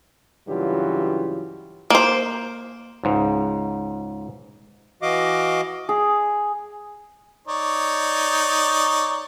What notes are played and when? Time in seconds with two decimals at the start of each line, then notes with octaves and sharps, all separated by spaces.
0.48 G2 C#3 E3 F#3 F4 G4
1.90 A#3 C5
3.04 C#2 G#2
5.02 E3 F#4 D#5 F5 D6
5.89 G#4
7.48 D#4 C#5 D5